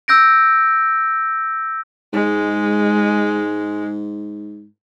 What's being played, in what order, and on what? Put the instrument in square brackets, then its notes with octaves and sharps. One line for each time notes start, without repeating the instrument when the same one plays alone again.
[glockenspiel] E6 G6 A#6 D7
[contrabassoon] G#2 [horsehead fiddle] G#3